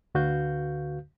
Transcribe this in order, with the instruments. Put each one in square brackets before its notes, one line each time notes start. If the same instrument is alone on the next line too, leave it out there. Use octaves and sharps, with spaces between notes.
[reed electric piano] D2 D3 F#4 B4 F5 G6